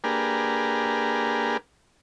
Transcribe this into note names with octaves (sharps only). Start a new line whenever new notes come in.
A#3 D4 G4 G#4 A#4 B4